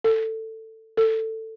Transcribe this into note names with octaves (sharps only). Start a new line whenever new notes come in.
A4
A4